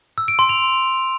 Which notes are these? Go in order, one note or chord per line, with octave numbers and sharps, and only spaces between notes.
E6
D7
C6
F7